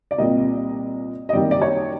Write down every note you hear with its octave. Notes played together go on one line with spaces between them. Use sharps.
D5
C2 A#2 G3 A#3 D#5
D#5
F#2 D#3 G3 A#3 D5
D5
C#5